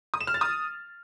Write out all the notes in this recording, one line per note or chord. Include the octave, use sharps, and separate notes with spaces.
D#6
E7
F6
A6
D#6